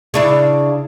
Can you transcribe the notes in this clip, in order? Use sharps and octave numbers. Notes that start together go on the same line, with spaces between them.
C#3 D4 E4